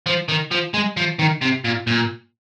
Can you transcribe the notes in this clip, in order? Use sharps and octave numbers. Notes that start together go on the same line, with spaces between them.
F3
D#3
F3
G#3
F3
D#3
C3
A#2
A#2